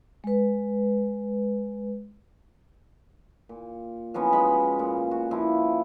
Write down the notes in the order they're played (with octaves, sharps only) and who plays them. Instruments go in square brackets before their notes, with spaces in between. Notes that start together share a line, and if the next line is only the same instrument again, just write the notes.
[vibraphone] G#3 B4
[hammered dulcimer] A#2
F3 F#3 B3 C#4
G#3 B5
A#2
F#4
F3 E4